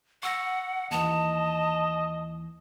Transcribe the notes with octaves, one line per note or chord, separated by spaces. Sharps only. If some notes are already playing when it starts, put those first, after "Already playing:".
F#5 C#6 E6 A#6
D#2 E3 D#5 A5